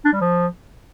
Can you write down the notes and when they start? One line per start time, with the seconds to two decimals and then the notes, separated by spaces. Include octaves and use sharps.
0.05 D4
0.13 G3
0.21 F3